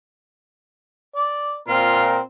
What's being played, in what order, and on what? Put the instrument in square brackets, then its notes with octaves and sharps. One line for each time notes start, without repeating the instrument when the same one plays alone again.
[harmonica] D5
[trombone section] A#2 [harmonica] C4 [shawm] F4 [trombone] A#4